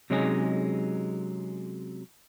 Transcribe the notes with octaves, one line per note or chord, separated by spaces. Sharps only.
C3 F#3 G#3 C#4 D#4 G#4